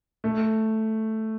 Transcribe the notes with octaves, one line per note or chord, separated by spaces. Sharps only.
A3